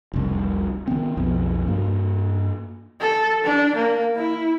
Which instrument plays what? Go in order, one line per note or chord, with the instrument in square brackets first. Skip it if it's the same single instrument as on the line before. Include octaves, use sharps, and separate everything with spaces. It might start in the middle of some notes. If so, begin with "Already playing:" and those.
[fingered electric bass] F1 C2
D#3 B3 C4
B1 F2 B2
G2 A#3
[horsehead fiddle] A4
D4
A#3
E4